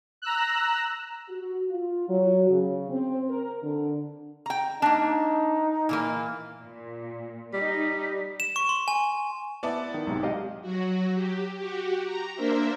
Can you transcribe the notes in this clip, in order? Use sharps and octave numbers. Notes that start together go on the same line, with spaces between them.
A#5 E6 F#6
F#4
F4
F#3
C#3
C4
A#4
D3
G5 A#5
A#3 D4 D#4
A#2 E3 A#3
A#2
G3 D#4 B6
E7
C#6
C6
G#5
B3 E4 D5 A5
D#3
B1 G#2 C3
G4 D#5 F5
F#3 F#4
G4
F#4 G4
A#5
A#3 D4 A#4 C5 E5